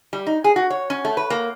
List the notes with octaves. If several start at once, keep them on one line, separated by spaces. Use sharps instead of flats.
G3
D#4
G#4
F#4
C#5
C#4
A3
B4
A#3